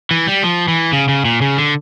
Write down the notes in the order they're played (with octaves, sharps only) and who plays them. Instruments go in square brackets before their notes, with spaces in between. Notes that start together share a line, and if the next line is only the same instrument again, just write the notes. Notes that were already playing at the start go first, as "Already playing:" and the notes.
[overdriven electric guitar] E3
G3
F3
E3
C#3
C#3
A#2
C#3
D3